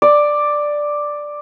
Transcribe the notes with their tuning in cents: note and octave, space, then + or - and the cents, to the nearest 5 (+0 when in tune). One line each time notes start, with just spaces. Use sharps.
D5 +5